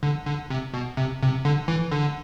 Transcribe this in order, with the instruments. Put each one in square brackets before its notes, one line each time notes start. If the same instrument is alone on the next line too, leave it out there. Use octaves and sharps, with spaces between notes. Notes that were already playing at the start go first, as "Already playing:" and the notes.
[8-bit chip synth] D3
D3
C3
B2
C3
C3
D3
E3
D3